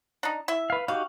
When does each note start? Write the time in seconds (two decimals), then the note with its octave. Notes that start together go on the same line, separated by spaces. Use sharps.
0.23 D4 D#4
0.48 E4 E5
0.70 B4 F5
0.88 D#4 F#4 G4 F5